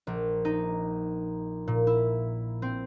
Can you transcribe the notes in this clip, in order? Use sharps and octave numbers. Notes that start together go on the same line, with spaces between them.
A#1
D#4
A#2
E4
C4